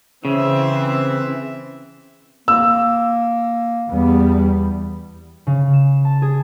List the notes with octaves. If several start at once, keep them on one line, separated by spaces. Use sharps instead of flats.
C#3 E3 C4 E5
A#3 E6
E2 G3 B3
C#3
E7
A5
G#4